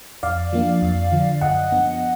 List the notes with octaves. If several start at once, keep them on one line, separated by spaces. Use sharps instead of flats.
F2 D5 F5
F3 A#3 D4
F2
D3 F3
F#2 D#5 F#5
F3 B3 D4